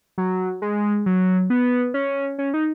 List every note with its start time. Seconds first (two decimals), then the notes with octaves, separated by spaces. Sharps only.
0.18 F#3
0.62 G#3
1.06 F#3
1.50 B3
1.94 C#4
2.39 C#4
2.54 D#4